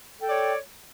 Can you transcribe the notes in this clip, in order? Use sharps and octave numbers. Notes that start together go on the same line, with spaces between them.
A4 C#5 D5 G5